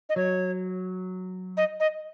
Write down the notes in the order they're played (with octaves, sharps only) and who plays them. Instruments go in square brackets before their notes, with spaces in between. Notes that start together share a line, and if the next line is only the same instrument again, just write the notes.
[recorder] D#5
[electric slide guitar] F#3 [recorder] C#5
[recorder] D#5
D#5